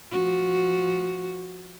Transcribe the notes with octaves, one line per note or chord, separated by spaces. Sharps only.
F3 F#4